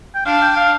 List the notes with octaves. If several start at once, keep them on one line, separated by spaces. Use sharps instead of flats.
G5
D4 F5
G5
F5